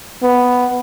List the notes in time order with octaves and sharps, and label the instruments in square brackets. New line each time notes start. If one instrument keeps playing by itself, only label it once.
[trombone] B3